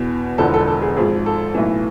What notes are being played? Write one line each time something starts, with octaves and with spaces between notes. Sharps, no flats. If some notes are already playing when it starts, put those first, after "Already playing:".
Already playing: E2 B2
E1 E2 D3 F3 A4
A4
A4
G#4
G#1 G#2 F3 G#4
A4
B1 A2 E3